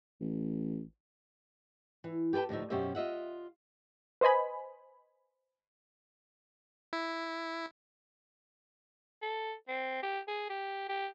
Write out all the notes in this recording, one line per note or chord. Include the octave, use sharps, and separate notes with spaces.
A1
E3
G4 A4 B4 G5 A5
D2 A2 F3 D#4 E5
F#2 B2 C#4 G4 C5 E5
F4 D#5 E5 F#5
B4 C5 D#5 G#5 B5
E4
A4
C4
G4
G#4
G4
G4